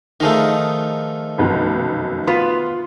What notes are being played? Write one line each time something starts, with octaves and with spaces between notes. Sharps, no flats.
D#3 F3 A3 D#4 G#4
F1 B1 F#2
B3 F4 B4 C6